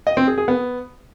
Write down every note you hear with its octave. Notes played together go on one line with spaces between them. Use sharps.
D#5
C4
G#4
G#4
B3